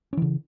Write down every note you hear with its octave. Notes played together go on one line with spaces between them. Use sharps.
C#3 E3 C#4